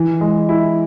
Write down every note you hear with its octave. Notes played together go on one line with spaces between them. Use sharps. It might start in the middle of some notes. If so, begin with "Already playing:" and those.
Already playing: E3
G#3
E4